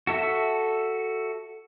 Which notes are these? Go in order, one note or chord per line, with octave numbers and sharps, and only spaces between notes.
F#4 A4 E5